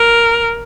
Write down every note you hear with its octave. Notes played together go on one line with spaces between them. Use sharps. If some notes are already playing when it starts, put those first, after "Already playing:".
Already playing: A#4